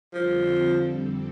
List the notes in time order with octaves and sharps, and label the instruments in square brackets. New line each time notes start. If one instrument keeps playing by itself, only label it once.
[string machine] F2 D3 G3 C4 A4 [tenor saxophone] F3